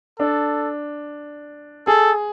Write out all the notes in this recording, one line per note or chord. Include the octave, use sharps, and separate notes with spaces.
D4 A4
G#4 A4